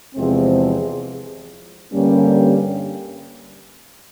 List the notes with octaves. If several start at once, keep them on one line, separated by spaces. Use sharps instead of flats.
E2 C3 F3 G#3 C4
G2 D3 G3 A#3 C#4